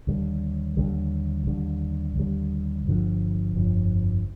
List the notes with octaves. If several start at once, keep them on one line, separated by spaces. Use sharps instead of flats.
D#2 D3 G3
D#2 D3 G3
D#2 D3 G3
D#2 D3 G3
G1 F2 D3 F3
G1 F2 D3 F3